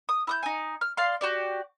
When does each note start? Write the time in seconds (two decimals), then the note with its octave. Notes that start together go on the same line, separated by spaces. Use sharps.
0.09 D#6
0.27 E4 D#6 G6
0.43 D#4 G#5
0.81 F6
0.97 D5 F5 C6
1.21 F#4 G4 D5